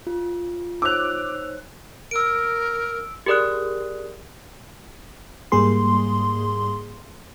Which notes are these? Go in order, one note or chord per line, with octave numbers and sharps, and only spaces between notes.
F4
D#4 C5 C#5 D6 E6 F#6 F7
A#4 E6 D7
G4 G#4 A#4 D5 D#6 F#6
G#2 G3 A#3 G#4 C6